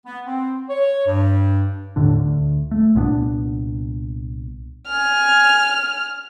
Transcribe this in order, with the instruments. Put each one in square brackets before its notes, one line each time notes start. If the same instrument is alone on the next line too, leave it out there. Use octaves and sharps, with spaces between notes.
[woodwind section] B3
C4
C#5
G2
[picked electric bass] D#2 A2 D3 D4
D2
A3
C2 A#2 B3 D4
[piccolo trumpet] G#5 [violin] F6